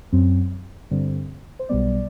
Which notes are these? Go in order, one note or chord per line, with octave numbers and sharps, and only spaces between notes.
F#2 F#3 C4
G2 D3 G3 C4
C5
B1 B2 G3 B3 D5